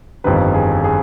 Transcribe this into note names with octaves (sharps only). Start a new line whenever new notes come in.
G1 F2 D#3 G3 B4
G#4
G#4